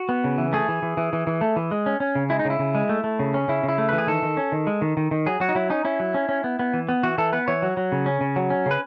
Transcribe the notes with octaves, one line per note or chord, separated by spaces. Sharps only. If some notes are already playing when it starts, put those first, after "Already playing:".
Already playing: F#4
B3
C#3
E3
A3 G#4
E3
E3
E3
E3
E3
A3
E3
G#3
C#4
C#4
C#3
G#3 E4
D#4
C#3
E4
C#3
G#3
A3
A3
C#3
C#4
C#3 E4
C#3
E4
A3
E3 B4
G#4
D#3 A4
D#3
C#4
D#3
G#3
D#3
D#3
D#3
F#3 G#4
F#3 F#4
D#4
F#3 E4
C#4 D#4
C#4 E4
F#3
C#4
C#4
B3
B3
E3
B3
E3 F#4
E3 A4
B3 B4
E3 C#5
F#3
F#3
C#3
C#4
C#3
F#3
C#4
C#3 B4